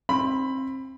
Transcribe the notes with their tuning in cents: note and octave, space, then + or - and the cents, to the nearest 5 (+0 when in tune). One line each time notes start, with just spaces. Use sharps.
C4 +25 B5 +10